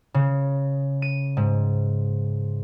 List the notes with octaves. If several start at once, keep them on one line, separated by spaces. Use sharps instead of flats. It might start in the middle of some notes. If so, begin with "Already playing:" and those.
C#3
D#7
G#2